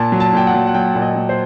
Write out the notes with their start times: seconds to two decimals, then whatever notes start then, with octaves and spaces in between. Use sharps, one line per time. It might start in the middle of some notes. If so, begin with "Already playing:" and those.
Already playing: A#2 A5
0.12 F#3
0.20 A5
0.33 A#2 G5
0.47 F#5
0.54 F#3
0.67 F#5
0.74 F#3 G5
0.93 A#2 F#5
1.02 D#5
1.16 F#3
1.29 C5